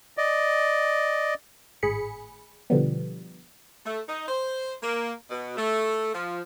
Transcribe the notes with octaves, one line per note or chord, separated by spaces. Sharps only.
D5 D#5
G#1 A2 G#4 B5 C#7
B2 D3 F3 G3 B3
A3
D#4
C5
A#3
B2
A3
F3